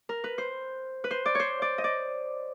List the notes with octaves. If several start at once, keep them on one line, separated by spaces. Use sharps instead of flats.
A#4
B4
C5
B4
C5
D5
C5 C#5
D5
D#5
D5